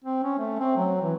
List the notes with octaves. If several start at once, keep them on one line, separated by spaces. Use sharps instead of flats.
C4
C#4
A3
C4
F#3
E3